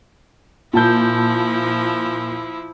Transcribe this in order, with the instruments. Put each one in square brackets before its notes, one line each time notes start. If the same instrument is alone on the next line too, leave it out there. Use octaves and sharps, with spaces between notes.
[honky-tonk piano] A#2 A5 G6 [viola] F3 E4